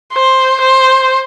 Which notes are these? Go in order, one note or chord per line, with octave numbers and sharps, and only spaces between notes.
C5
C5